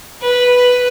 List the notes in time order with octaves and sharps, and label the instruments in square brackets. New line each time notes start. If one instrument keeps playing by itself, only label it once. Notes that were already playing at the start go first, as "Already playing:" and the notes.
[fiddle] B4